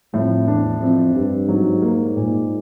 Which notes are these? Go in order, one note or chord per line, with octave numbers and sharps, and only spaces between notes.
F2 A2
E2 D4
F2 C4
G2 G3
G#2 F#3
A#3
A#2